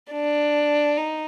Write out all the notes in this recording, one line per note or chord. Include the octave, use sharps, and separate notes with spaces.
D4
D#4